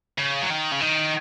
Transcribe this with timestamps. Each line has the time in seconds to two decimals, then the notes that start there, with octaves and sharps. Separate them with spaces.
0.18 C#3
0.42 F#3
0.50 D#3
0.72 C#3
0.81 D#3